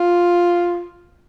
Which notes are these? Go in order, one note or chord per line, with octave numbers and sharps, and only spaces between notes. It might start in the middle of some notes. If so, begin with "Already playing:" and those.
Already playing: F4